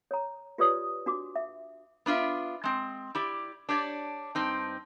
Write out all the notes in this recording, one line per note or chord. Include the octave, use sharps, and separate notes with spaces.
C#5 A#5
F4 G4 B4 C#5 D5 D#6
D4 F#4 D6
E5
B3 D4 F4 E5
G#3 C4
E4 G4 D5
D4 G4 C#5 D5
G2 C4 D#4